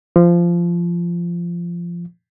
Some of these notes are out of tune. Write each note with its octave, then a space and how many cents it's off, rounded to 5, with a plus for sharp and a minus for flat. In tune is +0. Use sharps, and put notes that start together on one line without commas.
F3 -15